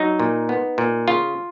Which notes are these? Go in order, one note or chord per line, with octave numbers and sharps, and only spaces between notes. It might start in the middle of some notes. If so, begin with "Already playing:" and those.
Already playing: F#3 D#4
A#2
B3
A#2
C#3 F4